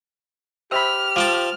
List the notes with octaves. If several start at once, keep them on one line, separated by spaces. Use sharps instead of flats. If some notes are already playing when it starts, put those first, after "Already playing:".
G4 C5 E5 B5 F6
F3 G5 A5 D6